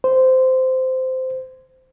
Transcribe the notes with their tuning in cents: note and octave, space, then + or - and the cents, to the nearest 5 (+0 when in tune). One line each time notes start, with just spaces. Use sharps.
C5 -15